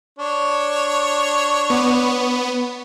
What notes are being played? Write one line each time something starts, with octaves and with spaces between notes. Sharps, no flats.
D4 C#5
B3